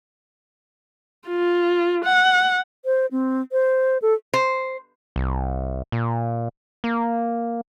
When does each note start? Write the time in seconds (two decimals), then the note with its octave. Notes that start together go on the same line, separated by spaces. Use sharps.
1.28 F4
2.05 F#5
2.85 C5
3.11 C4
3.52 C5
4.02 A4
4.34 C5
5.16 C2
5.92 A#2
6.84 A#3